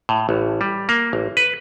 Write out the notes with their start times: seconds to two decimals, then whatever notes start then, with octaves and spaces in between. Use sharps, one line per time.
0.09 A2
0.29 A1
0.61 G3
0.89 A#3
1.13 A1
1.37 B4